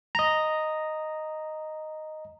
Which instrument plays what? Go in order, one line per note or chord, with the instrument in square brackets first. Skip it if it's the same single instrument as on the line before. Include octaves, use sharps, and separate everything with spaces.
[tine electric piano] D#5 A#5